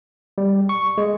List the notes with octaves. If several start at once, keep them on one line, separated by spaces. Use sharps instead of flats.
G3
C#6
G#3